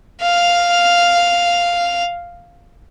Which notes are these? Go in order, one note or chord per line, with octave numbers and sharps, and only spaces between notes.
F5 F6